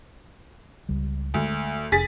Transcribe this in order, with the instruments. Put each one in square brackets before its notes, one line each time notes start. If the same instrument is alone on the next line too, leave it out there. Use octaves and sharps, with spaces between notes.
[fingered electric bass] C#2 G3
[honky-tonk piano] D2 [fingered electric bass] G#3
[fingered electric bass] F1 D4 [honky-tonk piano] G#4 A6 B6